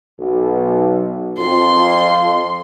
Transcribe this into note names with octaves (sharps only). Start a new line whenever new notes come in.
B1
F2 C6